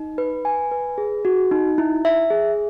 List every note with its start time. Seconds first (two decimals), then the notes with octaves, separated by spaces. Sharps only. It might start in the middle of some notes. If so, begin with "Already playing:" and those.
Already playing: D#4
0.18 B4
0.45 G#5
0.71 B4
0.98 G#4
1.25 F#4
1.51 D#4
1.78 E4
2.05 E5
2.30 G#4